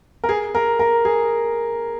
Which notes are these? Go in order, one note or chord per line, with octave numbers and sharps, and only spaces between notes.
A#4
G#4
A#4
A#4
G#4